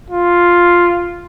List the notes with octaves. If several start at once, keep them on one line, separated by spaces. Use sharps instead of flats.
F4